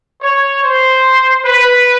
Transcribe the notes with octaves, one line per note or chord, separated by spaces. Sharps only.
C#5
C5
B4